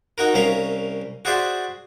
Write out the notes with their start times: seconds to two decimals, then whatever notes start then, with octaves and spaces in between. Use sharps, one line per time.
0.18 D#4 F#4 A#4
0.34 C2 C#4 A#4 E5 F5
1.25 F#4 G#4 C5 D5 E5